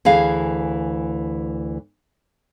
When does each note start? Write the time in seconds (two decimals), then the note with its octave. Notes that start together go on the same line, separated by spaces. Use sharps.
0.05 D2 E3 G#4 F5